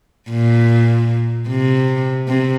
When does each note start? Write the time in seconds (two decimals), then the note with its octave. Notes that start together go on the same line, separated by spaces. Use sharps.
0.29 A#2
1.48 C3
2.28 C3